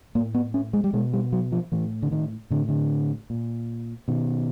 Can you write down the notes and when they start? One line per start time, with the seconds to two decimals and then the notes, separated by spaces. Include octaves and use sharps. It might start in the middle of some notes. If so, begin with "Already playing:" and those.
0.15 A2 A#3
0.34 B3
0.54 C#4
0.73 G#3
0.84 G3
0.93 B2 G#3
1.13 G3
1.32 F#3
1.52 F3
1.72 A2 E3
2.02 D3
2.12 D#3
2.50 A2 D3
2.69 D3
3.30 A#2
4.08 B2 D#3